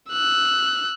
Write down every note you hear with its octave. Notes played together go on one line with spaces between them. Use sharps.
E6 F#6